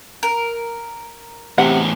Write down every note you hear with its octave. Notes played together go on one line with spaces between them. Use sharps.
A#4
E2 A2 C3 F#5